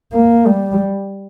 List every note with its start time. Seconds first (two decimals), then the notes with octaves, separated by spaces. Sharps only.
0.13 A#3
0.47 G3